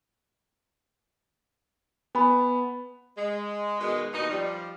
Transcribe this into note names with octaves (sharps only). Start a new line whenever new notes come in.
B3 G#5 B5
G#3
B2 D#3 G#3
D#2 B2 D#4
F3 G3